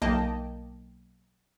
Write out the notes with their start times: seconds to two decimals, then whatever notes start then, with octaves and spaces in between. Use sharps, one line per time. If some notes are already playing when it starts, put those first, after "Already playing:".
0.02 B1 A#3 D#5 G5 A5